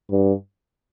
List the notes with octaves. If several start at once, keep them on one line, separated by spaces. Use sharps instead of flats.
G2